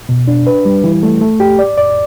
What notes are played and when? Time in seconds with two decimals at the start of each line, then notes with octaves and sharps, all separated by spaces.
0.09 B2
0.28 D4
0.47 B4
0.65 G3
0.84 E3
1.03 A3
1.21 A3
1.40 G4
1.59 D5
1.78 D5